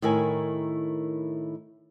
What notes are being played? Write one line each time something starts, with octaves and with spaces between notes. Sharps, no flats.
A2 D#3 E4 A#4 G#5